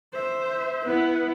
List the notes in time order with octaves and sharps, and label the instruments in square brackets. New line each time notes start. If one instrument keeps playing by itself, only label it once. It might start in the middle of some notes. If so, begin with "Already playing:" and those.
[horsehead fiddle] C5 E5
[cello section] B3 E4 [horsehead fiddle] B4